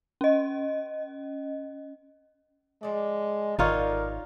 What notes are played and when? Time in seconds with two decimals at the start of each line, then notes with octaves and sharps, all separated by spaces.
0.21 C#4 D#5
2.83 F3 G#3 D5
3.59 G#1 D#4 F4 A4 A#4 C#5 D5 F#5